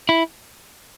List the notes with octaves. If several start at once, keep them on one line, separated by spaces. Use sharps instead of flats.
E4